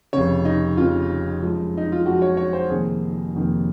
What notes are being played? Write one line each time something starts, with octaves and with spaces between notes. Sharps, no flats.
F1 F2 C#3 C#5
D#4
F1 F2 C#3 F4
F#2 F3 G#3
D#4
F4
F#2 F3 G#3 F#4
C#5
C#5
C5
F1 F2 D#3 A#3 G#4
F1 F2 D#3 A#3